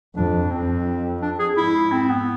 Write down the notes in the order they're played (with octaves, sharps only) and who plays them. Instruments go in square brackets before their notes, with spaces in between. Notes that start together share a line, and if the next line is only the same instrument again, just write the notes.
[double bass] F2 [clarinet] D4
[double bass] F2 [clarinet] C4
[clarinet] D4
G#4
[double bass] G#2 [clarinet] E4
[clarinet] C4
B3